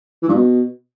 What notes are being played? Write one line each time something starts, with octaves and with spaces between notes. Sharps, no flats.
E3
G2
B2